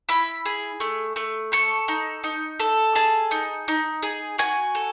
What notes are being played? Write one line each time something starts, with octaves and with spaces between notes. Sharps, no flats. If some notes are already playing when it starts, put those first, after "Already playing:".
E4 B5
G#4
A3
A3
A4 C#6
D#4
D#4
A4
G#4 A5
D#4
D#4
G#4
F#4 G#5
A4